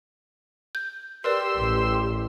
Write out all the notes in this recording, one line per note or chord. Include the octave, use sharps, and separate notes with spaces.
G6
G4 A#4 B4 D5 C6 E6
A1